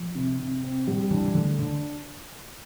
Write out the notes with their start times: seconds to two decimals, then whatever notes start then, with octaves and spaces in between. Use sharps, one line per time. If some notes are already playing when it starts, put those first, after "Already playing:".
Already playing: F3
0.15 C3
0.39 C3
0.63 C4
0.87 G3
1.11 E3 D4
1.25 E3
1.35 D3 A3
1.59 D3 D4